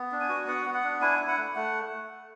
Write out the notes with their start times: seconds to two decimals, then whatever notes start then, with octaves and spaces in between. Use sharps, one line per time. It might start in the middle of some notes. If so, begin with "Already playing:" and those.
Already playing: B3
0.11 D4
0.20 G#5
0.29 F#4
0.47 B3 F#5
0.65 B3
0.74 F#5
0.83 D4
1.01 E4 G#5
1.19 E4
1.28 F#5
1.37 A3
1.55 A3 F#5